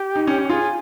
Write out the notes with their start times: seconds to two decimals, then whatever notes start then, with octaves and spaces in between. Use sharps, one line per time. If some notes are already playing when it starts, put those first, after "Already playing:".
Already playing: G4
0.16 D#4
0.27 C#4
0.38 C#4
0.50 F4 G#4